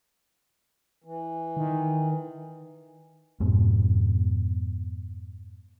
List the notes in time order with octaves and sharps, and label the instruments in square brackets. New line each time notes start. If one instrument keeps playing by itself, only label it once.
[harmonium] E3
[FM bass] D#3
[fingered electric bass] F2 G#2 B2 B3